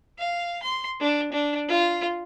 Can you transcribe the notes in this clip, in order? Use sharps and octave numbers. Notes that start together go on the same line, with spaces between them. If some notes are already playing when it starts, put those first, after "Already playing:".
F5
C6
D4
D4
F4